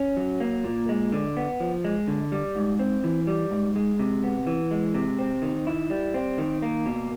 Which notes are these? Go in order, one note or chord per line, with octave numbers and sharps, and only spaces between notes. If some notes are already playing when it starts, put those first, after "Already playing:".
Already playing: C#4
F#3
A#3
A#2
G#3
D3
B3
F3
G#3
D3
G3
G#2
C4
E3
G3
G#2
G#3
C3
B3
E3
G#3
C3
C4
D#3
E4
G3
C4
D#3
A#3
B2